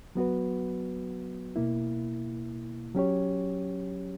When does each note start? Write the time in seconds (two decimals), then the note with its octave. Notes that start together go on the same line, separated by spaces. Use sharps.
0.15 F#3 B3 F#4 B4
1.56 B2 A#3 E4
2.95 F#3 C#4 G4 C#5